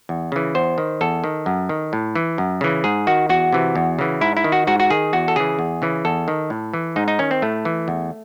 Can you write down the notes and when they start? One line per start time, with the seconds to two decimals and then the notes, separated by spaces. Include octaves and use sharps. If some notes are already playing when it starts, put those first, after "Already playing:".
0.09 E2
0.32 C#3 E3
0.55 E2 C5
0.78 D#3
1.01 E2 A4
1.24 D#3
1.46 F#2
1.69 D#3
1.93 A2
2.15 E3
2.38 F#2
2.61 C#3 E3
2.84 G#2 G#4
3.07 D#3 F#4
3.29 E2 F#4
3.53 C3 E3
3.76 E2
3.99 C#3 E3
4.21 G#2 E4
4.37 E4
4.44 D#3
4.52 F#4
4.67 G#2 F#4
4.80 F#4
4.90 D#3 G#4
5.13 E2 F#4
5.28 A4
5.36 C#3 E3 G#4
5.59 E2
5.82 C#3 E3
6.05 E2 A4
6.28 D#3
6.50 A2
6.74 E3
6.96 G#2 D#4
7.08 D#4
7.19 D#3 C#4
7.31 C4
7.42 A2 A3
7.65 E3
7.88 E2